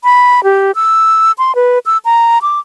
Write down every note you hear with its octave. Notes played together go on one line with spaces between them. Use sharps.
B5
G4
E6
C6
B4
E6
A#5
D6